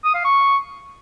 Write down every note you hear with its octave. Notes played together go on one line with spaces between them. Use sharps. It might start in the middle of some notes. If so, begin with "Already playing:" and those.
D#6
F5
C#6